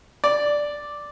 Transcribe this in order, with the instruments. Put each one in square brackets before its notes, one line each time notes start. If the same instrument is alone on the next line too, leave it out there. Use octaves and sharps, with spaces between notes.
[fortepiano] D5